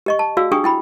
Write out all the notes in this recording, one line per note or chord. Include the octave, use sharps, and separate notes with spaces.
G4 D#5 C#6
A5
F#4 G#4 D5 F5 E6
D4 G4 G#4 G5 C#6 D#6
E4 G5 B5